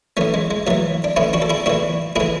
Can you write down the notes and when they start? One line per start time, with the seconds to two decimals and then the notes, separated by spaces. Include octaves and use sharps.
0.17 A2 E3 A3 C#4
0.34 G#3
0.51 G#3
0.67 A2 E3 F#3 A3
1.04 D4
1.16 A2 E3 C#4 E4
1.33 D4 F#4
1.42 A4
1.50 E4 G#4
1.66 A2 E3 D4 F#4
2.16 A2 E3 E4 G#4